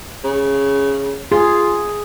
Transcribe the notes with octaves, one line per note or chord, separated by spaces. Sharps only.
C#3
F4 G#4